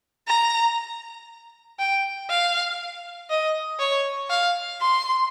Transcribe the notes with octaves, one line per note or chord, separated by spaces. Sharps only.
A#5
G5
F5
D#5
C#5
F5
C6